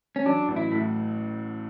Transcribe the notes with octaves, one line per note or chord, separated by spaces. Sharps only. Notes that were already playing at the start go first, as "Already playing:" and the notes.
C#4
F#3 D4
A1
E4
A2